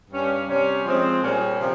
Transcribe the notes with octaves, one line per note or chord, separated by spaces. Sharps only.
G2 G3 C#4
C3 G3 C#4
F3 G#3 C4
A#2 G3 C#4 G#4 C5
C3 F3